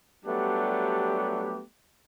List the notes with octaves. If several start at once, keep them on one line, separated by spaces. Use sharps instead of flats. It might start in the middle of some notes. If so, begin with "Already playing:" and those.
F#3 G3 A3 B3 D4 G4